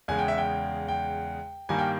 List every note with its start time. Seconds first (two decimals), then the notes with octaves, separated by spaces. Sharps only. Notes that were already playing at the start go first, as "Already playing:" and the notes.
0.08 E2 C#3 G#3 G#5
0.18 G5
0.28 E5
0.38 G5
0.88 G5
1.69 G2 D#3 G3 A#3 G#5
1.79 G5